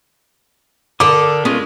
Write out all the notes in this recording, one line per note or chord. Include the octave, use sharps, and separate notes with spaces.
D3 A4 A#4 D6 D#6
G#3 B3 C#4 F4